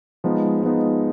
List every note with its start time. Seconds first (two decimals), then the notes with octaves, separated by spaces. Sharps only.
0.24 F3 G#3 B3 D#4
0.63 F3 G#3 B3 D#4